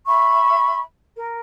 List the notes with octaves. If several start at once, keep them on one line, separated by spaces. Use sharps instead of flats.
E5 B5 C#6
A#4